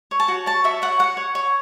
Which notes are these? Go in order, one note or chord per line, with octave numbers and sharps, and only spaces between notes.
C#5
A5
F#4
C#5 A5
F#4 E5
C#5 F#5
F#4 F#5
C#5
C#5